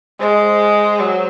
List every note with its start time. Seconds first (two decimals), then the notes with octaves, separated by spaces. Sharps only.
0.20 G#3 C5
1.00 F#3